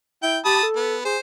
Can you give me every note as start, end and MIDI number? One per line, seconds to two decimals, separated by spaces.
0.23 0.39 64
0.23 0.38 79
0.45 0.61 67
0.45 0.65 81
0.45 0.65 83
0.45 0.65 87
0.63 0.96 69
0.76 1.04 59
1.05 1.17 68
1.05 1.20 72